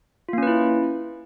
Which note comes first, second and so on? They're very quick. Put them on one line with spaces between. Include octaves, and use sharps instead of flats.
F4 A#3 C#4 B4 E4